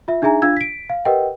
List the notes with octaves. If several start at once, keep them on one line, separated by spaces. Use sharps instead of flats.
F4 E5
D4 D#4 G#4 E5 G#5 A#5
D4 F4 F5 E6 G#6
B6 D7
F5
G4 A#4 B4 D#5 F#5 G5